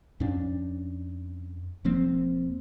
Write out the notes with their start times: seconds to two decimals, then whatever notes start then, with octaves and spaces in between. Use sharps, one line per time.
0.20 F2 C#4 D4
1.84 E1 F3 A#3 C4